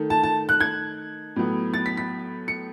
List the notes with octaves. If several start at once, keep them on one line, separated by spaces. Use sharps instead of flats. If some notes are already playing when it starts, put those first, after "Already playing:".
Already playing: D#3 A3
A5
A5
F#6
G#6
A2 F#3 B3
A6
B6
B6
C#7